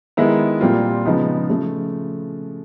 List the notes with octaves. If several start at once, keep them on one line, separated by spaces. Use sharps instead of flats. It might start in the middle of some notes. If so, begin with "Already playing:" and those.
D#3 G#3 B3 E4
A#2 G3 C4 F4
C#3 F3 G#3 B3 D#4
C#3 F3 A3